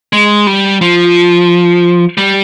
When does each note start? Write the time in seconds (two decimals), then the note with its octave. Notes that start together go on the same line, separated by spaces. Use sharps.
0.13 G#3
0.47 G3
0.81 F3
2.18 G3